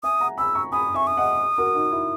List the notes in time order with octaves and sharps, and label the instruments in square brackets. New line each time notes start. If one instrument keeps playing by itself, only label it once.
[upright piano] E5 G#5 [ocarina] D#6
[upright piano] F#5 A#5
[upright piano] G#5 B5 [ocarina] E6
[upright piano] A#5 C#6
[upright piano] G#5 B5 [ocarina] D#6
[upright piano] E5 G#5 [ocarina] C#6
[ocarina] D#6
[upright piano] D#5 F#5
F#4 A#4
D#4 F#4
E4